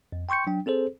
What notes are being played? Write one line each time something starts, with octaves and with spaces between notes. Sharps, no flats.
F2
G5 C6 C#6 G6 C#7
F#3 D4 G5
C4 G#4 A4 C5